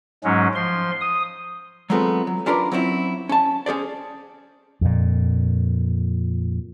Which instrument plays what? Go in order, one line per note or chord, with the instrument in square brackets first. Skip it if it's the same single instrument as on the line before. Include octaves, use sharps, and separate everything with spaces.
[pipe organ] G#2 F#3 G#3 C#4
F3 C6
D#6
[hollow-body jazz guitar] F#3 G#3 A3 B3 C4 F4
F#3
C#4 D4 F4 A#4 B4 D5
F#3 C4 C#4 E4
C#4 A5
C#4 G#4 C5 D5
[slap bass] F2 A#2